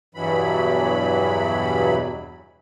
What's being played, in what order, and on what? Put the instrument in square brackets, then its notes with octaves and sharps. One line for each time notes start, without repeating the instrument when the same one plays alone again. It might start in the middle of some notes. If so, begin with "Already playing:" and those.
[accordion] E2 G2 B2 E3 F#3 B5